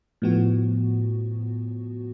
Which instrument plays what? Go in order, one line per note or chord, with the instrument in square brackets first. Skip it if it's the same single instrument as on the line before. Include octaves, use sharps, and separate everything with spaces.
[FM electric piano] A2 F3 B3 F#4